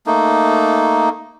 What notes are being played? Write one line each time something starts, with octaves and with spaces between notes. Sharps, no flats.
A3 A#3 D#4